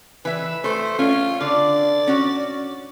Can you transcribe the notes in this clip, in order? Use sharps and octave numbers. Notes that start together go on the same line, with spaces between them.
E3 B4 E5
A3 C5
C#4 F4
D3 D5
C#4 F#4